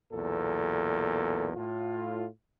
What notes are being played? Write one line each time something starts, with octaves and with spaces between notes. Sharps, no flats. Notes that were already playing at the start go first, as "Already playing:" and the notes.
B1 E2 A#2 A4
A2 F4